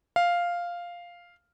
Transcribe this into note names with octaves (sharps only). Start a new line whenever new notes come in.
F5